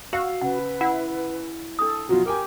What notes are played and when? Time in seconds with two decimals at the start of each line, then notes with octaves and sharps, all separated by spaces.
0.13 F#4 F5 E6
0.41 C#3 B4 F#5
0.81 E4 F#5
1.79 D4 A4 D#6
2.09 B2 F3 F#3 F4
2.26 G4 A#4 G5 G#5